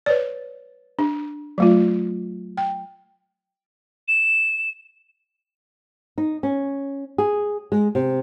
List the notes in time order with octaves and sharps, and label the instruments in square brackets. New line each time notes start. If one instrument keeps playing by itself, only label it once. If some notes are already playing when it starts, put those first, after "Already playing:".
[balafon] B4 C#5 D5
D4
F#3 A3 F4
G5
[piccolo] E7
[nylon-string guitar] D#4
C#4
G#4
G#3
C3